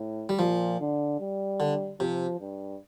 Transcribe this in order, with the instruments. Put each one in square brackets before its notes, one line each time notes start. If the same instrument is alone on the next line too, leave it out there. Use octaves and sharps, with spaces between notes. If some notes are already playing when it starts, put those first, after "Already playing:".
Already playing: [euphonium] A2
[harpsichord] G3
[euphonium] A#2 [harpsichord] F3
[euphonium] D3
G3
[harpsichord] D3
[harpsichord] C3 [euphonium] F3
[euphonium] G2